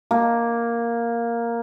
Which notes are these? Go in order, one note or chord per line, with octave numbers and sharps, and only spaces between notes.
A#3